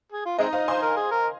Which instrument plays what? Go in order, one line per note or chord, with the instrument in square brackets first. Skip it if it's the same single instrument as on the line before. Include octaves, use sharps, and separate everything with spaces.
[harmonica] G#4
F4
[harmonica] G#3 C4 D#4 [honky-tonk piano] D#5
[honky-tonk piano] C5 F5
[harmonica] C5 [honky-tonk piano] G#5 C6
[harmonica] A#4
G#4
A#4